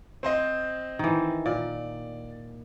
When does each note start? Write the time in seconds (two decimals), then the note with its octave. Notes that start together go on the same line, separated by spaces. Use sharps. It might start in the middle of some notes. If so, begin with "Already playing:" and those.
0.23 C4 C5 D#5
0.99 D#3 E3
1.46 A#2 D5